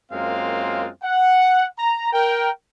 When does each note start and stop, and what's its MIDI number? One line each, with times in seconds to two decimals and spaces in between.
0.12 0.88 42
0.12 0.88 56
0.12 0.88 58
0.12 0.88 60
0.12 0.88 65
0.12 0.88 77
1.02 1.65 78
1.79 2.10 82
2.13 2.49 70
2.13 2.49 79